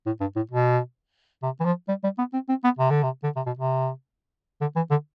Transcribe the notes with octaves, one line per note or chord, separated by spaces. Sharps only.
A2
G2
A2
B2
C3
E3
F3
G3
G3
B3
C4
C4
B3
C3
D3
C3
D3
C3
B2
C3
D3
E3
D3